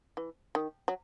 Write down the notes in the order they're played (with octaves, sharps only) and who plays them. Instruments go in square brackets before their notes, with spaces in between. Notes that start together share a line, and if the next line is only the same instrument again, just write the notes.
[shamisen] E3
D#3
F#3